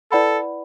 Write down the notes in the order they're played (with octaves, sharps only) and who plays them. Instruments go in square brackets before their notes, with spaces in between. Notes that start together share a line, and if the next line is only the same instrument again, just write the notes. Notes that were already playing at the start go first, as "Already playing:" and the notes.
[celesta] E4 B4 D5 F#5 B5 [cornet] A4